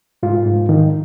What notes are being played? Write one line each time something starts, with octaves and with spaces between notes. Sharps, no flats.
G#2 F4
G#2
D#3